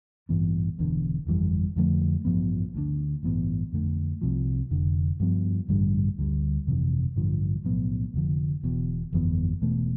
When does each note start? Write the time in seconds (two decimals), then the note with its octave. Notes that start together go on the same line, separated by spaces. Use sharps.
0.29 A1 G2 E3 B3
0.79 E1 E2 D3
1.27 G1 F2 E3 G3
1.76 F2 D3 F3 A3
2.25 A1 G2 F3 B3
2.74 D2 D3 G3 D4
3.23 A1 G2 E3 B3
3.73 F2 D3 A3
4.22 C2 C3 F3
4.71 F1 F2 D3
5.20 G2 F3 B3
5.69 A1 G2 D3 G3
6.18 D2 D3 G3
6.67 G1 F2 C3 E3
7.16 A1 G2 D3 F3
7.64 B1 A2 F3 B3
8.14 F1 F2 D3 F3
8.63 E1 E2 B2
9.13 G1 F2 E3 B3
9.62 E1 E2 B2 A3